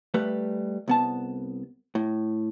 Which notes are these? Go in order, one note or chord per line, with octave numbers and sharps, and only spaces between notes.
G3 A3 B4
C2 B3 A5
A2